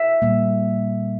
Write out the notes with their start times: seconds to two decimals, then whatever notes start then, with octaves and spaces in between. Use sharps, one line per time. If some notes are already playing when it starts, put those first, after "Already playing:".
Already playing: E5
0.22 A#2 G3 A#3